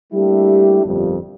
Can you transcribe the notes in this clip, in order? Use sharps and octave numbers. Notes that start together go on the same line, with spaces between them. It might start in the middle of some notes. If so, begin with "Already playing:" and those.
G3 A3 A#3 D4 E4 G4
G1 F2 A#2 F3 G3